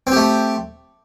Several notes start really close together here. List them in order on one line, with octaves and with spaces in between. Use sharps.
C4 G4 A3